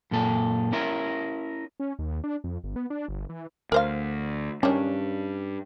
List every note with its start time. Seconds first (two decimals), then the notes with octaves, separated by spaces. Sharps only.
0.11 F#2 A#2 A4
0.72 C#4 E4 A#4
1.80 C#4
1.99 D#2
2.24 D4
2.44 F2
2.64 G1
2.76 B3
2.90 D4
3.09 G1
3.29 E3
3.72 D2 A#4 C5 F5
4.63 G2 D#3 C#4 D4